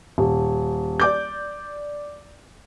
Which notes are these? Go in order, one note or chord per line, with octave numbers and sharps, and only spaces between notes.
D#1
D5 D6 G6